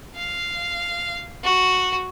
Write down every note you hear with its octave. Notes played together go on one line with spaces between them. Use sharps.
F5
F#4